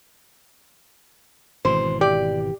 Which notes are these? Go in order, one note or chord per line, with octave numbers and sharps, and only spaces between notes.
G#1 B2 E3 C5
G4 D5